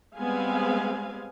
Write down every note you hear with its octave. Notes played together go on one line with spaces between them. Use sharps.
G3 G#3 B3 C4 F5 G#5